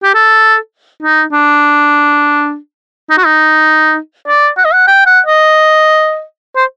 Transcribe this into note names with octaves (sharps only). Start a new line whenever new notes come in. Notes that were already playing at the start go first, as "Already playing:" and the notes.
G4
A4
D#4
D4
D#4
F#4
D#4
D5
F#5
D#5
F#5
G5
F#5
D#5
C5